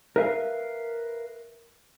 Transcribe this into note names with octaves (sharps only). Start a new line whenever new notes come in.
A#4 B4 E5 F5